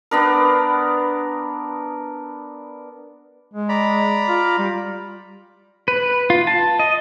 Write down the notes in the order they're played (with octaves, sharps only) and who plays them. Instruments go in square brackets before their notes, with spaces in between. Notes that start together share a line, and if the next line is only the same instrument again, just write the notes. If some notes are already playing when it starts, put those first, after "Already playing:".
[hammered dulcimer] B3 D4 A#4
[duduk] G#3
[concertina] D5 A#5 B5
[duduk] F4
G3
[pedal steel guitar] B4
F4
A5
D#5